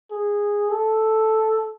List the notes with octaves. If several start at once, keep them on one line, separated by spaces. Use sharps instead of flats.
G#4
A4